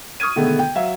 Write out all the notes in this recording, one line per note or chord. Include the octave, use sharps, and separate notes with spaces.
C#6 D#6 F6 G#6 D#7
B2 D3 D#3 G#3 A3 B3
G5
F#3 E5 F5